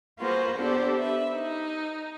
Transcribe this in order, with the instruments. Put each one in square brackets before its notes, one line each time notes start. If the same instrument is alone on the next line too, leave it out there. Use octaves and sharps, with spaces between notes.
[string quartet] A#3 F4 F#4 G#4 B4 C5
B3 D4 G4 A4 C5
B4 E5
D#4